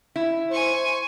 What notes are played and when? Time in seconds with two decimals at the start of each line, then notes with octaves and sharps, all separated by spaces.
0.16 E4
0.51 C5 G#5 C#6